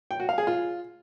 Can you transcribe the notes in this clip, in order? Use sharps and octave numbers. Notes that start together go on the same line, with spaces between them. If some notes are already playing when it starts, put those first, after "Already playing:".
G5
F#4
F5
G#4
F4